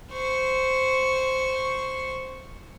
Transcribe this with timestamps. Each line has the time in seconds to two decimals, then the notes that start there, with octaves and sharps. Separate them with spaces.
0.12 C5 C#6